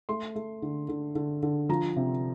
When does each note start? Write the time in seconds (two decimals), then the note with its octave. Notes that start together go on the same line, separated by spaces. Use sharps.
0.09 A3 C6
0.35 A3
0.62 D3
0.89 D3
1.15 D3
1.43 D3
1.69 F3 A#5
1.96 C3